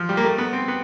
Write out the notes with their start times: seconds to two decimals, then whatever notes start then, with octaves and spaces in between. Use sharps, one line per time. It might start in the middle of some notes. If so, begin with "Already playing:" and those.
Already playing: F3
0.09 G3
0.17 A#3
0.23 A3
0.38 B3
0.53 C4
0.68 B3